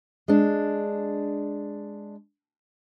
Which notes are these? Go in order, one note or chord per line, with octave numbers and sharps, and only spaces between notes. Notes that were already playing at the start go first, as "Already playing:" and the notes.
G#3 D4